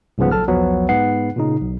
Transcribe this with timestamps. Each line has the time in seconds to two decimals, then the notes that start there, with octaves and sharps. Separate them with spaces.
0.18 C2 G#2 C#3 F3 B3
0.32 A#1 F#3 A4 A5 F6
0.48 B1 E2 F3 F#3 B3
0.89 G#2 B3 F#5 C7
1.36 A#2 C#3 D#4
1.62 B1